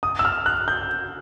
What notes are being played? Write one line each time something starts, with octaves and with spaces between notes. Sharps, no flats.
D#6
E6
F6
F#6
G6